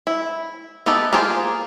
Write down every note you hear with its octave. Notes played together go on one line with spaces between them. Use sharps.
E4
B3 D#4 G4 A4 B4
A#3 F4 G4 G#4 C5